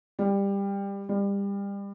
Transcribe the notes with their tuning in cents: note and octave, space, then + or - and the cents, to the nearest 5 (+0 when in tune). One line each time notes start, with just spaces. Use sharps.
G3 +20
G3 +30